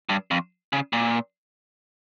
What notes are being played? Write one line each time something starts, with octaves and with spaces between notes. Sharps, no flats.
G2
F2
C#3
A#2